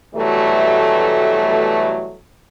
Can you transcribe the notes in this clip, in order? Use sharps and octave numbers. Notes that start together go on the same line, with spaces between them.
B2 E3 F#3 G3 A3